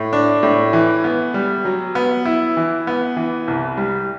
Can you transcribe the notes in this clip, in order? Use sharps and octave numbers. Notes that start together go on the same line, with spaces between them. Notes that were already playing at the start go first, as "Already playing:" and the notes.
Already playing: A2
D4
A2
E3
B3
G3
F#3
B3
E4
E3
B3
E3
C2
G3